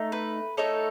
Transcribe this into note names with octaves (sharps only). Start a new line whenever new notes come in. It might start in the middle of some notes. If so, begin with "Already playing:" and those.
Already playing: A3 D#4
B4
A3 D#4 A4 C#5